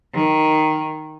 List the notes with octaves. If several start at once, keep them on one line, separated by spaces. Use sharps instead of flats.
D#3